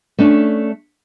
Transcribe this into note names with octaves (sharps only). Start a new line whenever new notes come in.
A3 C#4 D4